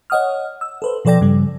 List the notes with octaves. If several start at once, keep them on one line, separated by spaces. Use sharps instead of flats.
C#5 D#5 F#5 D#6 F6
E6
A4 B4 C5
B2 F3 A4 D5 G5 A#6
G2 C#3 G3